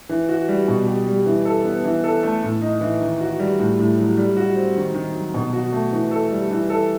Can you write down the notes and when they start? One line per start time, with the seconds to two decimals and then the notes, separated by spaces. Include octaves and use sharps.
0.09 E3
0.29 F#4
0.48 G3
0.68 B2
0.87 G4
1.07 G3
1.26 E3
1.45 A4
1.64 B3
1.84 E3
2.04 A4
2.23 A3
2.43 A2
2.62 D#4
2.81 E3
3.01 D#3
3.20 F#4
3.39 G3
3.59 A2
3.79 A2
3.98 F#3
4.17 G3
4.37 F#4
4.56 C4
4.76 D#3
4.95 D#3
5.15 F#3
5.34 B2
5.53 F#4
5.72 A3
5.92 E3
6.11 A4
6.32 G3
6.51 E3
6.70 A4